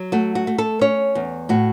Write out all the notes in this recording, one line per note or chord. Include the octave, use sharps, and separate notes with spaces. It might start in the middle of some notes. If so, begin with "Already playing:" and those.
Already playing: F#3
A3 F#4
F#4
A3
A4
C#4 C#5
E2
A2 F#4